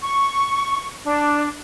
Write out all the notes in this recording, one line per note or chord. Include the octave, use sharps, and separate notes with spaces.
C#6
D4